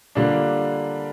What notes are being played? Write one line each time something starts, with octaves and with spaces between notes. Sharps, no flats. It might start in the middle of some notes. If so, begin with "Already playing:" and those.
D3 G3 A#3 D4 F4